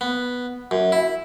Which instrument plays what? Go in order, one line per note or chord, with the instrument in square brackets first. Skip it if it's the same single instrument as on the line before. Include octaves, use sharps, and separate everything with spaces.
[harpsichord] B3
F#2
E4